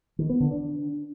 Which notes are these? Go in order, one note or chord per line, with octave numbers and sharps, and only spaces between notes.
D#3
B3
D3
D4